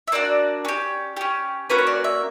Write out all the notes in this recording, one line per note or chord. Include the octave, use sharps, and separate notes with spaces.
E5
A#3 D4 F#4 D5
C#4 G4
C#4 G4
A#3 C#4 F#4 B4
C#5
D5
E5